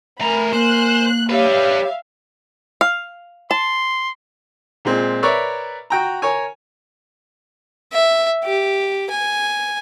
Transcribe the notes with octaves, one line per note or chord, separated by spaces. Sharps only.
A3 A#4 G#5 A#5 B5
A#3 C5 F#6
G3 G4 B4 C#5 E5 F5
F5
A5 C6
A#2 G#3 C4
A#4 B4 C#5 D5 E5
F#4 G5 A#5
A#4 C#5 G#5
E5
G4
G#5